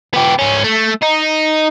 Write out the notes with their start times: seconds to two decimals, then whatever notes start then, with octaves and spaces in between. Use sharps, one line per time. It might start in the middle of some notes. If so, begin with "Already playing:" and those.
0.14 B3 G4
0.39 G#2 C#4
0.64 A3
1.03 D#4